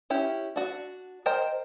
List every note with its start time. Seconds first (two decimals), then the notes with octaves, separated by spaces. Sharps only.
0.10 C#4 E4 G4
0.56 D4 F#4
1.26 A#4 C5 D#5 G5 A#5